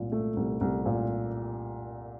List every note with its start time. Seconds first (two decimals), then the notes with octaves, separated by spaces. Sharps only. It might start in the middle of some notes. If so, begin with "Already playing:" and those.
Already playing: C2 A#2
0.12 A3
0.36 C2
0.61 C2
0.86 A#2